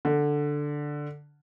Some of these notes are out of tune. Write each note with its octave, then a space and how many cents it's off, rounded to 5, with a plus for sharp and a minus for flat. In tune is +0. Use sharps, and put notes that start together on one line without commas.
D3 +0